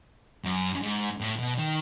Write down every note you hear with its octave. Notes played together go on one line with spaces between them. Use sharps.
F#2
G#2
A2
B2
D#3